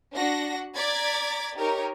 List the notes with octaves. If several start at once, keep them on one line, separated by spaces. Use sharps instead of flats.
D4 F#4 F#5 A#6
D5 A#5 D6 G#6 A6 B6
D#4 G4 A#4 C#5